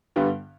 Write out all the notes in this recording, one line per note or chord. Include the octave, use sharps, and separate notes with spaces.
G2 D3 G3 B3